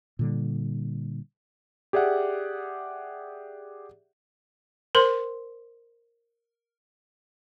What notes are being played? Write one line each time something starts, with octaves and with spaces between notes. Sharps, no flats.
A#2 D3 G3
G4 G#4 D5 E5 F#5
A#4 C5 C6